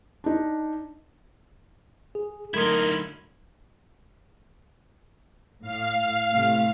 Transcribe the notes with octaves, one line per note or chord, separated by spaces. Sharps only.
D4 D#4
G#4
D3 F#3 A3 D#4 E4 A#4 C6 G#6
A2 F5
A2 C3 A3